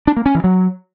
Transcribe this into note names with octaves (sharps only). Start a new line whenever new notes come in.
D4
A#3
C#4
E3
F#3